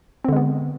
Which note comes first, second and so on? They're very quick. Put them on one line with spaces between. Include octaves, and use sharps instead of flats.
C4 D3 G#3 B3